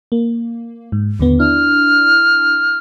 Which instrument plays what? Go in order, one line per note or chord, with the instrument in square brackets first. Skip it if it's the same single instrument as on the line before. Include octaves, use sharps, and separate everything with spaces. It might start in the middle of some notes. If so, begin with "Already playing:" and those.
[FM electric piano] A#3
G#2
D#2 D3 B3
[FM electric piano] D4 E4 [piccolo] F6